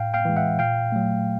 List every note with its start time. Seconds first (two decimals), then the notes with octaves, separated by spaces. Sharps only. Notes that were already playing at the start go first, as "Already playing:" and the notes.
Already playing: A2 F5 G5
0.14 F5 G5
0.25 E3 G#3
0.37 E5 F#5
0.59 A#2 F5 G5
0.92 F#3 A3